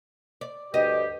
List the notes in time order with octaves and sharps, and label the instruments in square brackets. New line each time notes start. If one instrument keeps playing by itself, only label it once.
[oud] D5
[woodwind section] D2 G2 G4 [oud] D#5